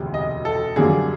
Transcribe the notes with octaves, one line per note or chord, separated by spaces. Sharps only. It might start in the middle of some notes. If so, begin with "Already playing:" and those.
Already playing: E1 D2 C3
D#5
A4
F#2 D3 G3 A#3 G#4